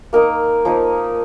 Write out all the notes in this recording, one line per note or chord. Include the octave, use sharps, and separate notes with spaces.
A#3 D#4 A#4
F3 A#3 D#4